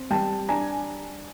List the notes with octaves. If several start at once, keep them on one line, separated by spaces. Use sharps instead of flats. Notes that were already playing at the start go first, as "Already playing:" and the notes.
Already playing: C4
G3 G5 A5
D4 G#5 A#5